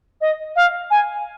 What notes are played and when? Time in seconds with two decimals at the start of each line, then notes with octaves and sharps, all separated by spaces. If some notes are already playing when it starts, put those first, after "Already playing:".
0.21 D#5
0.56 F5
0.91 G#5